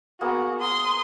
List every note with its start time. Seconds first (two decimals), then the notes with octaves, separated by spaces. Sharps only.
0.21 A#3 B3 F#4 G#4
0.60 C6 D#6